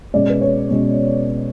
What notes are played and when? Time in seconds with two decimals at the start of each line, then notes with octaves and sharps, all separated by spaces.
0.14 B2 G#3 C#4 D5
0.30 B4
0.41 C#5
0.69 B2 G#3 C#4